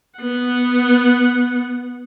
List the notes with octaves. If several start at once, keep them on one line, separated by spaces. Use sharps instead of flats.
B3 F#5